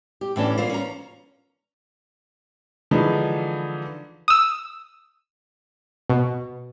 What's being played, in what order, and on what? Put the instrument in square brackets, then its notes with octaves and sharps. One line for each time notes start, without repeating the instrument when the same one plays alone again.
[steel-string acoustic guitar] G4
A2 E3 C#4 D4
A#3 F4 C5
C#4 A#5
[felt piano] D3 E3 F3 G#3 D#4 B4
[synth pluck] D#6 E6
B2